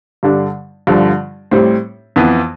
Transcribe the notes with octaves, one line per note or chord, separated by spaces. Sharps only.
G2 D3 G3 D4
G2 D3 F3
A2 G3 C4
F2 E3 B3